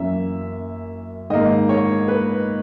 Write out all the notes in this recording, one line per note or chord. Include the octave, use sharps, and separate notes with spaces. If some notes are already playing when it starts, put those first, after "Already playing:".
Already playing: F#2 E3 A#3 C#4 E5
G#2 D#3 A#3 D#5
C#5
B4